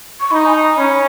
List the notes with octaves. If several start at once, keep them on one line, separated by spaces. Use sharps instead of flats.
C#6
D#4 B5
G#5
A#5
C#4 B5